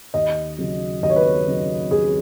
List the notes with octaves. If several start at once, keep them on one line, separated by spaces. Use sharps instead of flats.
D#2 D#5
C#3 F#3
D#2 D#5
C#5
B4
C#5
C#3 F#3
D#2 G#4